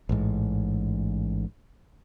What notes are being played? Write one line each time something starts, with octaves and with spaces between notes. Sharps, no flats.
A1 G#2